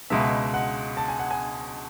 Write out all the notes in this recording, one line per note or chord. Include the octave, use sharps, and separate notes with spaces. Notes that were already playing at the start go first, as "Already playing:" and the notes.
C#2 B2 G#3 B3 E5
F#5
A5
G#5
F#5
G#5